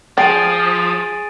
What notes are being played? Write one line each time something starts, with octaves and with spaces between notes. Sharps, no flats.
F3 G#4 G5 A6 D7 D#7